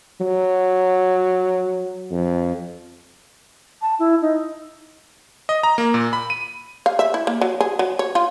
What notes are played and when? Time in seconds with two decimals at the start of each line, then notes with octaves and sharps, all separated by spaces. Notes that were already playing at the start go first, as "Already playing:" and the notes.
0.21 F#3
2.11 F2
3.82 A5
3.99 E4
4.22 D#4
5.49 D#5
5.63 A#5
5.78 A#3
5.94 A#2
6.13 B5
6.30 D#7
6.86 F5
6.99 E5
7.14 E4
7.27 A#3
7.41 F#3
7.60 G#4
7.79 F#3
7.99 C#5
8.15 F4